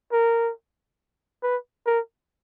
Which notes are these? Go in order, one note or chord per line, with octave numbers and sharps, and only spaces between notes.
A#4
B4
A#4